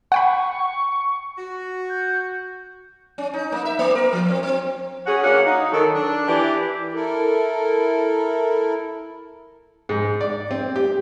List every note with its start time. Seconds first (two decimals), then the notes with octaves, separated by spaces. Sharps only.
0.12 F#5 G5 B5 C#6
1.38 F#4
1.90 G6
3.18 C#4
3.34 D#4
3.52 A#3
3.65 E5
3.79 A#3
3.95 A#4
4.13 F3
4.30 C4
4.43 C4
5.06 C#4 F#4 G#4
5.23 C#3 A#3 C#4 D4 F#4 F#5
5.46 D#4
5.71 D#3 F#3 A4
5.94 D4
6.27 E3 G4 D5
6.93 E4 A4 A#4
9.89 G#2
10.21 D5
10.51 C4
10.76 G4